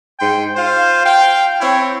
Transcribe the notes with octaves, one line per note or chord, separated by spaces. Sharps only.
G#2 G5 C6
F4 C5 F5
F5 G5
C4 E4 C#5